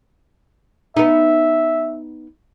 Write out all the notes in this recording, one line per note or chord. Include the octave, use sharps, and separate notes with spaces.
B3 D#4 E5